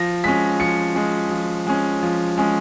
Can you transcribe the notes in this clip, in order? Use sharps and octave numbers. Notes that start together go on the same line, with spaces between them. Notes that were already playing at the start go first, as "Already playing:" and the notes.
Already playing: F3 A#6
G#3 C#4 B6
F3 C#7
G#3 C#4
F3
G#3 C#4
F3
G#3 C#4